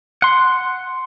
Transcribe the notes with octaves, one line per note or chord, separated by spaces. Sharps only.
F#5 C6